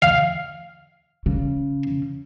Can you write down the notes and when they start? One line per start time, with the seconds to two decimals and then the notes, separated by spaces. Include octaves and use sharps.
0.02 F5
1.26 C#3